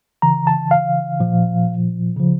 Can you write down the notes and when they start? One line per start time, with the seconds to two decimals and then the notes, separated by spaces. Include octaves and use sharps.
0.22 C#3 E3 A#5
0.47 A5
0.71 F5
1.20 A#2 F3
2.16 C#3 F3